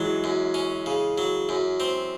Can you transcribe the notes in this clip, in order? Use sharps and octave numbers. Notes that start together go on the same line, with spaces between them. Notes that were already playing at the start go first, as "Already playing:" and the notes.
Already playing: E3 F#3 G#3
F#2
C#4
C#3
F#3
F#2
C4